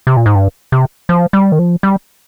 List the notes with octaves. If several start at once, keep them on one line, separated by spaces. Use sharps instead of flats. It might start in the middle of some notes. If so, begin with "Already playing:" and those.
C3
A#2
G#2
G2
C3
F3
G3
D#3
F3
G3